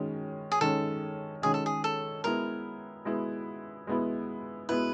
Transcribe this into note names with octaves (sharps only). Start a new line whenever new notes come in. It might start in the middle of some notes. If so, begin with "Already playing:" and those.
Already playing: D#3 G#3 C#4
G#4
D#3 G#3 C#4 A4
D#3 G#3 C#4 G#4
A4
G#4
A4
G#3 B3 E4 A#4
G#3 B3 E4
G#3 B3 E4
G#3 B3 E4 B4